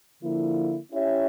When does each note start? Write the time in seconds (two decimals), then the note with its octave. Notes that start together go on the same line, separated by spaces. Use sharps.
0.21 D3 F3 A#3 E4
0.91 C#4 E4 G4 C#5 E5